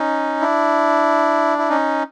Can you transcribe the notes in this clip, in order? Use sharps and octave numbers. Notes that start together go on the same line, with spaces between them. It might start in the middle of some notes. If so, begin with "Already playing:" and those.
Already playing: C#4 D#4
D4 E4
E4
C#4 D#4